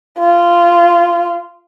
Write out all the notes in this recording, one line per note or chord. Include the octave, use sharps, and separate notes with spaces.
F4